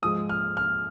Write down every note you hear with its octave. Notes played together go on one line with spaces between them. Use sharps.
G#2 F3 G#3 D#6
F6
F6